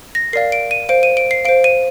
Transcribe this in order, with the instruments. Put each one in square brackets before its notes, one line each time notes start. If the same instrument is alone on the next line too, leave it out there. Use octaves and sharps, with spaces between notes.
[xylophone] A#6
A#4 D5 F5 C7
D7
D#7
C5 F5 D7
D#7
D7
C7
F5 D7
C5
D#7